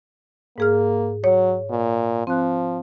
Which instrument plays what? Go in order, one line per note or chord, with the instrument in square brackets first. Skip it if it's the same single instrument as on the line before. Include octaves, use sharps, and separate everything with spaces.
[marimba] G#2 G#4 F6 [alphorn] A#3
[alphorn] F#3 [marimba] C#5
[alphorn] A#2
[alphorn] F3 [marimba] C4 F#6